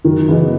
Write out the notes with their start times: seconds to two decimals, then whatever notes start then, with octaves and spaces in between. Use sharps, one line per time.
0.04 F#2 D#3
0.28 C#3 E3 B3 D#4